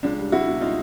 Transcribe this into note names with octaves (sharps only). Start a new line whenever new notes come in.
C#2 D4
G3
C#2 E4 F#4
B2
D#4 F4